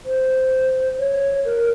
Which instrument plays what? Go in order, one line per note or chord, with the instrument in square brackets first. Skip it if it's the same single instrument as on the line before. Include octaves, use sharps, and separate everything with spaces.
[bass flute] C5
C#5
A#4